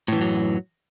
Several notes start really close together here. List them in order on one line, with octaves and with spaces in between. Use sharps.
A2 E3 F#2 F#3